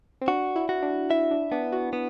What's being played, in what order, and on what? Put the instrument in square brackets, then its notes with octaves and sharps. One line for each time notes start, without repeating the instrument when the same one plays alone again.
[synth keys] C4
[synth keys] D4 [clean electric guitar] F#4
[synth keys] E4
[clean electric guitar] F#4
[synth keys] D4
[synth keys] E4 [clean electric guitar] E5
[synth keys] D4
[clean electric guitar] B3 [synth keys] D4
[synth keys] F#4
[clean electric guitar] B3